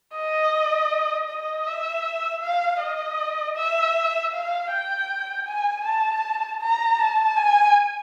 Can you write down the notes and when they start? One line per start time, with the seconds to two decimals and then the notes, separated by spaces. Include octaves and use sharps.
0.14 D#5
1.29 D#5
1.67 E5
2.42 F5
2.81 D#5
3.57 E5
4.33 F5
4.71 G5
5.47 G#5
5.85 A5
6.62 A#5
6.99 A5
7.37 G#5